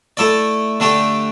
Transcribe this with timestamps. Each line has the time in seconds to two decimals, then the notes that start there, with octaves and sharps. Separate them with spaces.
0.17 A3 E4 A4 D5
0.80 D3 A3 D4 G4